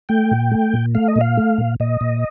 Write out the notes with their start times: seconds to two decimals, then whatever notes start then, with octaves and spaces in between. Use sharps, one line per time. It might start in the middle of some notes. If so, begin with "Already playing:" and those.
0.09 A3 G5
0.31 A#2
0.51 A3
0.73 A#2
0.95 A3 F5
1.08 D#5
1.16 A#2
1.21 F5
1.37 A3
1.58 A#2
1.80 A#2 D#5
2.01 A#2